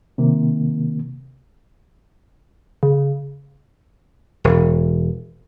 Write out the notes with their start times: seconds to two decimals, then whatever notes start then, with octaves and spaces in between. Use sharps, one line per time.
0.18 C3 D#3 A#3
2.83 C#3
4.44 E1